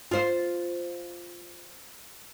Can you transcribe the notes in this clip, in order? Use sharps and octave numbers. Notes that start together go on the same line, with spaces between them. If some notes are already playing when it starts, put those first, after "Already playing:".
F4 C5